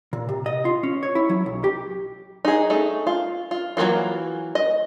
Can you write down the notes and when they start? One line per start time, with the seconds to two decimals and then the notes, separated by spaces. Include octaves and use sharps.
0.13 A#2
0.29 C3
0.46 D#5
0.65 F4
0.83 C#4
1.03 C#5
1.15 E4
1.29 F#3
1.46 B1
1.64 G4
2.45 D#4 G#4
2.70 A3 D#4
3.07 F4
3.51 F4
3.77 E3 F#3 G3 A#3 F4
4.55 D#5